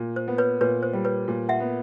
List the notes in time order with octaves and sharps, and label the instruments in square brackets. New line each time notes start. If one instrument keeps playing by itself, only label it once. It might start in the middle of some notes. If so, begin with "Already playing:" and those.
Already playing: [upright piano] A#2
[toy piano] C5
[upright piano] B3
[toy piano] B4 C#5
[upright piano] A#2 [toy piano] B4 C#5
[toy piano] C5
[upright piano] G3
[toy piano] B4 C#5
[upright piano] A#2
[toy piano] E5 F#5
[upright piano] B3